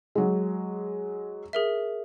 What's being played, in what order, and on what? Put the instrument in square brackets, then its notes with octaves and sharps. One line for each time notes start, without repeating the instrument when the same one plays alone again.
[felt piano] F#3 G#3
[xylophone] G#4 A#4 E5